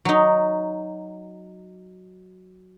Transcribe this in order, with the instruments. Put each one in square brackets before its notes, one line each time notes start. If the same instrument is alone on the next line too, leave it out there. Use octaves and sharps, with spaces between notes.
[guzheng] F#3 D#4